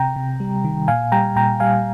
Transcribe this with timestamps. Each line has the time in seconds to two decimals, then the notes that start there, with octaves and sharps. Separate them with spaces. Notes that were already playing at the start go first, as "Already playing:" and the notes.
Already playing: C3 G5 A#5
0.16 C3
0.40 G3
0.64 D#3
0.88 A#2 F5 G#5
1.12 G3 G5 A#5
1.36 A#2 G5 A#5
1.60 G3 F5 G#5